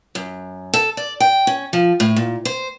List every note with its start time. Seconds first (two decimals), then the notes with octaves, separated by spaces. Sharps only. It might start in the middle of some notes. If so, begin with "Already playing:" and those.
0.15 F#2
0.74 A4
0.97 D5
1.20 G5
1.47 C#4
1.73 F3
2.00 A2
2.16 A#2
2.45 C5